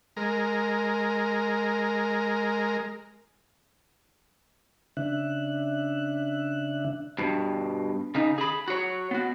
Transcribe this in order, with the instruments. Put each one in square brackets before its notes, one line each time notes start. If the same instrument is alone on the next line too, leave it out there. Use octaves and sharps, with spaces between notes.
[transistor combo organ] G#3 A#4
[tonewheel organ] C#3 D4 E5 F#6
[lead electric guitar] G2 B2
C#3 D#4
G#4 B5
F#4 C#5
B3 F#4